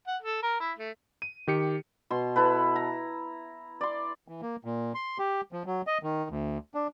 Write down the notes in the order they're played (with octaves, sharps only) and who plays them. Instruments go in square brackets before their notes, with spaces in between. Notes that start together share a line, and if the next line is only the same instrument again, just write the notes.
[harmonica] F#5
A4
A#4
E4
A3
[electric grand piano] D#7
D#3 G4 C#7
[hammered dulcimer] B2 C6
E4 A4 B4
A#5
D5 C6
[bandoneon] E3
A#3
A#2
C6
G4
F3
F#3
D#5
D#3
D2
D4